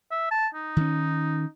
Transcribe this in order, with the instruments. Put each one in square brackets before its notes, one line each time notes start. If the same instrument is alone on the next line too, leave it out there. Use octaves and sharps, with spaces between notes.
[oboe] E5
A5
D#4
[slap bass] D#3 C#4